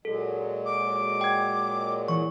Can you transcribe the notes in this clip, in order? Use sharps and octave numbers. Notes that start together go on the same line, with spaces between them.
A#2 F#3 G#3 A4
D6
G5 G#6
E3 C#6